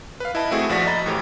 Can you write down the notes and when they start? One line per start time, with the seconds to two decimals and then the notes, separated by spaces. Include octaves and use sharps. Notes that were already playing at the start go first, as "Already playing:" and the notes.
0.20 B4 F5
0.35 E4 D#5 A5 B5
0.51 A3 C4 E4 F#4 G#4
0.69 A#1 F3 F#4 D5 A#6 B6
0.87 D#5 A#5 B5 A6
1.06 A2 E3 G4